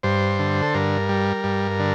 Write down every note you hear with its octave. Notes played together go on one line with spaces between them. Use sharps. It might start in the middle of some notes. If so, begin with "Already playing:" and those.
G2 C5
D3
A4
G2 A#4
G3
G2
D3